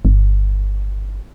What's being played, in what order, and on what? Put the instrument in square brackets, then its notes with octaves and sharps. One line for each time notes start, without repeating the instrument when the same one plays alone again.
[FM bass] G1